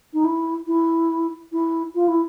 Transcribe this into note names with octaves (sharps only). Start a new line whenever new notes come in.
D#4
E4
E4
E4
F4
E4